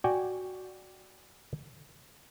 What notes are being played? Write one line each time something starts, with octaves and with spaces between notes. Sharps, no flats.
F#4 D5 G5 G#5